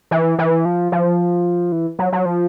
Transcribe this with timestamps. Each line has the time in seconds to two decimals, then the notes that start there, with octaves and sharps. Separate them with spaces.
0.11 E3
0.39 E3
0.65 F3
0.92 F3
1.72 E3
1.99 F#3
2.12 F#3
2.26 F3